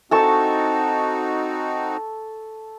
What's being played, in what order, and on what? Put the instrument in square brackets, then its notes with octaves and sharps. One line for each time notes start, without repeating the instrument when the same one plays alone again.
[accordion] C4 D#4 F#4 [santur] A4 A5 C#6